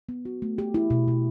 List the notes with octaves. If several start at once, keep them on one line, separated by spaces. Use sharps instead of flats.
B3
F#4
A3
G4
E4
B2
B2